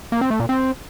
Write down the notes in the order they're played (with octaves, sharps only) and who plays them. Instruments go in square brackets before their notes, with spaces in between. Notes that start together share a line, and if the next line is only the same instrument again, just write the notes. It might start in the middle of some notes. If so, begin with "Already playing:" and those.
[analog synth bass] A#3
C4
A3
A#2
C4